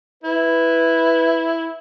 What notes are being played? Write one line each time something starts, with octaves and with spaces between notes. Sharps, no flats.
E4 B4